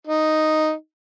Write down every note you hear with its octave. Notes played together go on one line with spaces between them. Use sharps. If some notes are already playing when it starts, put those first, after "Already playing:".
D#4